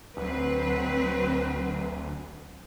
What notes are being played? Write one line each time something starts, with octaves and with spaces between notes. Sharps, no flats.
D2 F#3 C4 B4